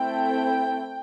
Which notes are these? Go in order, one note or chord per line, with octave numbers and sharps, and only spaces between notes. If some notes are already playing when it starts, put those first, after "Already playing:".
Already playing: A3 C4 E4 A4 G5